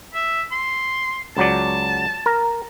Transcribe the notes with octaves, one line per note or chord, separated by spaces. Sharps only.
E5
C6
C#2 F#3 D5 A5
A#4